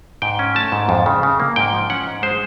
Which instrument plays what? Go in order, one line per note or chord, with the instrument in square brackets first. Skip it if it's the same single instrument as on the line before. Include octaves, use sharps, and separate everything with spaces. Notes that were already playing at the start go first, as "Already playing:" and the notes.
[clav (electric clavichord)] G#2 G5
C#4
A3 A5
G#2
F2
C#3
C#3
A#3
G#2 G5
F3
C#4 F#5
G#2
G#3 C5